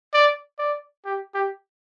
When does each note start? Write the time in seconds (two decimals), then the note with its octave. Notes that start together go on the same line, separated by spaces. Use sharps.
0.14 D5
0.59 D5
1.05 G4
1.35 G4